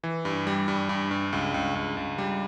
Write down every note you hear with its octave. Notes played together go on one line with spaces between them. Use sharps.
E3
G2
G3
G2
G2
G2
C#2
C#2
C#2
C#2
G3